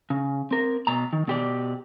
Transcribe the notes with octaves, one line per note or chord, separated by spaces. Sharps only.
C#3
C4 A#4
B2 A#5
D#3
B2 G4 D5